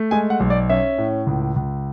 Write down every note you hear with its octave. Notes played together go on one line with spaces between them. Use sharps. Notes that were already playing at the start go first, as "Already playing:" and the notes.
Already playing: A3
G#3 G#5
F#5
B1
D5
C#4 E5
A2
C#2
C#2